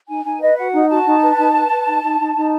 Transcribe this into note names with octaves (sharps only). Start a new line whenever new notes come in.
D#4 G#5
D#4 G#5
B4 D#5
F#4 F#5
D#4
F#4 A5
D#4
B4
D#4
B4
B4
D#4
D#4
D#4
D#4